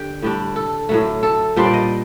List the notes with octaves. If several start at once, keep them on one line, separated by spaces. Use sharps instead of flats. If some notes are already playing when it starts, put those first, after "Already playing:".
Already playing: D3 G4
A2 G3 D4
A4
A2 F#3 A3
A4
A#2 G3 D4 C5
D5
D#5